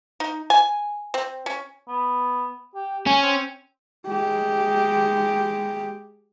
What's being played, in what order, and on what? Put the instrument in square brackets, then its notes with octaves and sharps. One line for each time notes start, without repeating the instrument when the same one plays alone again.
[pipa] D#4
G#5
C4
C#4
[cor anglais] B3
G4
[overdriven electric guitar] C#4 [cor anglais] G#5
[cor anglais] C4
[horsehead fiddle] G#3 G4